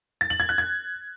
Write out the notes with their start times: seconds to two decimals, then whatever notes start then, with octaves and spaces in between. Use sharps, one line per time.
0.21 A6
0.30 F#7
0.40 G#6
0.49 F#6
0.58 G#6